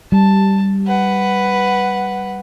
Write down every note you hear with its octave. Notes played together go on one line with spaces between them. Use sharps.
G3 A5
B4 F#5